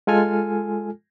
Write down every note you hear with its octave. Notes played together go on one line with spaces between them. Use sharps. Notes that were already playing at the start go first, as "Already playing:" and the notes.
G#3 F4 A4 G#5 F6